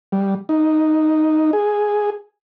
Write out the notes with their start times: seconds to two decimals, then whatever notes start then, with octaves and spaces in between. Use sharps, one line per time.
0.12 G3
0.49 D#4
1.53 G#4